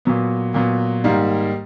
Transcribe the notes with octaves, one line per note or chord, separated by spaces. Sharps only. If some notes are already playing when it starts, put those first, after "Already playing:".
A#2 F#3 B3
A#2 F#3 B3
G#2 D#3 G3 A#3